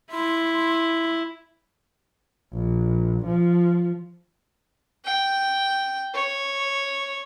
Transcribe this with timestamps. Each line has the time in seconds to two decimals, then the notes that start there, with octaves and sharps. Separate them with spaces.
0.11 E4 C6
2.54 A#1
3.26 F3
5.05 G5
6.14 C#5